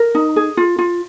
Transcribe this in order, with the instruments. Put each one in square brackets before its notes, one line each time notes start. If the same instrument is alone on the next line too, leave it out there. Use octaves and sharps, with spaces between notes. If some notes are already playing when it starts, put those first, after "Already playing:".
Already playing: [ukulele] A#4
D#4
G#4
F4
F4